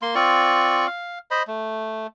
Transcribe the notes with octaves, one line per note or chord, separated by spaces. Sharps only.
A#3 C6
C4 F4 D5 C#6
F5
C5 D#5 B5
A3